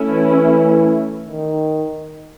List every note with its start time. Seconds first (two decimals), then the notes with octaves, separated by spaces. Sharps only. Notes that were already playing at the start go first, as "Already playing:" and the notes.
Already playing: A3 C#4 E4
0.10 E3
1.29 D#3